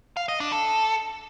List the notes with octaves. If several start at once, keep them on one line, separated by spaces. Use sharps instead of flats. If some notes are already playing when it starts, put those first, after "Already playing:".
F5
D#5
D4
A4